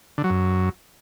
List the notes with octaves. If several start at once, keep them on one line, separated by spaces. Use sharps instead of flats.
D3
F#3
F#2